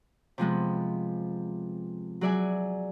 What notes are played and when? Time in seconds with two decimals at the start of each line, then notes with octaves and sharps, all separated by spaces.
0.38 C3 F3 G#3 B3
2.21 F#3 G#4 D5 E5 G#5